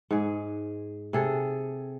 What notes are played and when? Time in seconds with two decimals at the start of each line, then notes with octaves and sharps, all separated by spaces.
0.11 G#2 G#4
1.13 C3 G#4 A4